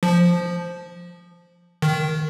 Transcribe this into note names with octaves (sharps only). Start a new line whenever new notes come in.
F3
D#3